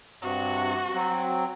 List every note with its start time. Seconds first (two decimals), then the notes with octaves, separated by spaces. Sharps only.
0.22 G2 C3 F#4
0.94 F#3 C4